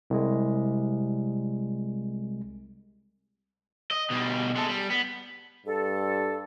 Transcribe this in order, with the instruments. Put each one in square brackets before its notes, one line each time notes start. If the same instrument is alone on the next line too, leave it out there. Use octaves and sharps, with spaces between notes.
[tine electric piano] C2 G#3
[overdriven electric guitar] D#5
B2 G3
G#3 A4
G3
B3
[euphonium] G2 [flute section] A4